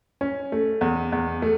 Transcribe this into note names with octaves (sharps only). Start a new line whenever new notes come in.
C#4
A3
E2
E2
A3